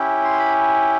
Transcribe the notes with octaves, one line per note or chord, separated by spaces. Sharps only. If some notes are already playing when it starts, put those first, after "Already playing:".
Already playing: C#4 E4 G4
C6
B5